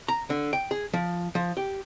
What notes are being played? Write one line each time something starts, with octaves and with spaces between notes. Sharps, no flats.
A#5
D3
G5
G#4
F3
F3
G4